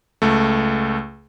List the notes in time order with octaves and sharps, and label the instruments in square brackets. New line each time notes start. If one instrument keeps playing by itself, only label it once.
[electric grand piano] C#2 A3